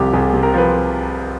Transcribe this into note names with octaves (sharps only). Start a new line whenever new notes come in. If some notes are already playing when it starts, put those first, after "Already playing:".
Already playing: C2 C3 F3 G4
C2 G#4
G#4
C3
A#4
F3 B4